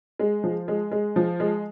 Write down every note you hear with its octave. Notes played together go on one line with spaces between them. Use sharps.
G#3
F3
G#3
G#3
F3
G#3